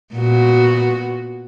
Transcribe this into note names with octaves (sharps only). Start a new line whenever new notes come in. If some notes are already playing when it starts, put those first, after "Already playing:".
A#2 B3 F#4